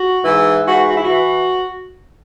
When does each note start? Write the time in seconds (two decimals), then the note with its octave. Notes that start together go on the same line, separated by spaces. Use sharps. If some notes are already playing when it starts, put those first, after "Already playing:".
Already playing: F#4
0.23 G#2 E3
0.66 G#2 E3 F#4
0.88 F#4
0.95 E4
1.03 F#4
1.10 E3